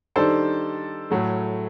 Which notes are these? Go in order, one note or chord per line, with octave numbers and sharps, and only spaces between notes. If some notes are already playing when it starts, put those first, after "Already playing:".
D#3 G3 D4 A4 C5
A2 F#3 A3